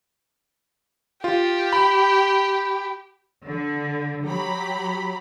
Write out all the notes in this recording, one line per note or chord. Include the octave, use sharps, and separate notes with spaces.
F4 G4
B5
D3
F#3 G4 A#5 B5